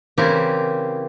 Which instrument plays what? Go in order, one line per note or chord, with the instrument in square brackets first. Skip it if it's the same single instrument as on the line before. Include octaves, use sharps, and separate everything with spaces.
[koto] C#3 E3 C4 E4 G4 A#4